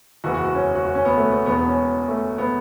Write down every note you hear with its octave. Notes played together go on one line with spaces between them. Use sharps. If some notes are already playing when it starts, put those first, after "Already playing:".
F#1 E2 E3 F#4
F#4
F#4
C#4
F#4
F#4
C#4
B3
A3
B3
E1 E2 B2 B3
B3
C#4
A3
B3